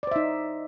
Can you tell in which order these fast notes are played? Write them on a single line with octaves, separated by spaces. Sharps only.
D5 C5 E5 D#4